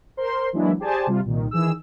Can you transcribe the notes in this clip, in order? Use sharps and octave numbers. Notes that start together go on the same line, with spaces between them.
A#4 C5 C6
E3 F#3 G#3 A#3 D4 E4
G4 G#4 C5 D5 G#5 A5
C3 G3 F4
C2 A#2 D#3
D#3 E3 G#4 E6